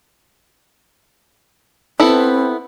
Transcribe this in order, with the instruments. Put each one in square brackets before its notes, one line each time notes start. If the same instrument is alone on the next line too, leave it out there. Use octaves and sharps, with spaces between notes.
[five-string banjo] B3 E4 A4 [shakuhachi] C4